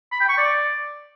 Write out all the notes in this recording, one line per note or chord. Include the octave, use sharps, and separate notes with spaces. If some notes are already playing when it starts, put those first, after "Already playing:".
B5
G5
C#6
D5